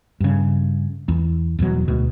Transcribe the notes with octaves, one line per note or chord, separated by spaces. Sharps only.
G2 C#3
E2
D#1 E2 B2 F#3
D2 B2